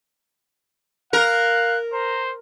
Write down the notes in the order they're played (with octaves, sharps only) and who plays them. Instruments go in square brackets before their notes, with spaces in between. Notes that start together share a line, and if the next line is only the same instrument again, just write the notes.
[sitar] A#4 [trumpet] F5 [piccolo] F#6
[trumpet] C5 [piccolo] A#5